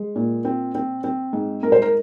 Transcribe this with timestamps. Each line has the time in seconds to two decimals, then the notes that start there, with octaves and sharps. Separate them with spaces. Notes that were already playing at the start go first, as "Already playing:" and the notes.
Already playing: G#3
0.16 A#2
0.45 C4
0.75 C4
1.04 C4
1.33 G#2
1.63 G#2 A#4
1.72 C5
1.82 A#4